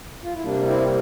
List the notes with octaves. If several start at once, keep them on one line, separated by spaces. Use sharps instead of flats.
F4
E4
C3 G3 A#3 D4
C4 E4